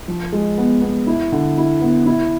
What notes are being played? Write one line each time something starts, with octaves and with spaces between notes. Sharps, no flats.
F3
G#3
B3
B3
E4
D3
E4
B3
E4